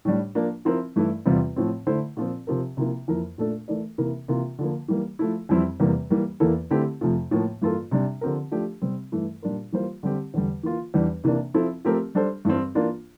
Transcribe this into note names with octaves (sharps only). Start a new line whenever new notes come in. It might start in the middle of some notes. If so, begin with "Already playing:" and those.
A2 G3 D4
F3 A#3 D4
F3 C4 E4 A#4
G2 E3 A3 E4
E2 C3 G3 C4 F4
A2 F3 C4
D3 A3 E4 A4 C5
A#2 F3 C4
C3 F3 C4 G4 A#4
C3 F3 A#3 E4
F2 E3 A#3 E4 A#4
A#2 A3 D4 A4
E3 A3 E4 A#4 D5
C3 E3 A#3 E4 A#4
C3 E3 A#3 F4 A#4
D3 F3 A#3
E3 G3 A#3
F3 A3 E4
F2 E3 G3 C4 E4
E2 C3 E3 G3 A#3
E3 G3 A#3
E2 E3 A#3 E4 A4
D3 A3 C4 E4 G4
F2 C3 F3 A3
A2 F3 A#3
G2 E3 A#3 F4 A4
C3 G3 D4
D3 F3 C4 G4 A#4
F3 A3 D4 G4
C3 G3 C4
G2 E3 A3 E4
A#2 G3 D4 F4 A#4
E3 G3 A#3 F4 C5
D3 G3 C4 G4
E2 D3 G3
E3 A#3 F4
E2 E3 G3 D4
C3 E3 A#3 D4
F3 C4 E4 A4
F3 A3 C4 G4 A#4
G3 D4 A4 C5
G2 E3 G3 C4
E3 A#3 D4 F4